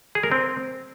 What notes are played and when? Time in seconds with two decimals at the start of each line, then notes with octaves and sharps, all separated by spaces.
0.15 G#4
0.23 A#4
0.32 C4